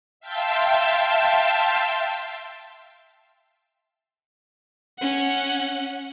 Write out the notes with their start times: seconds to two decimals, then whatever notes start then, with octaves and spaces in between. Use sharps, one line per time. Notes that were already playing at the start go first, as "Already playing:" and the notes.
0.20 E5 F5 G5 A5 C6 E6
4.99 C#4 F#5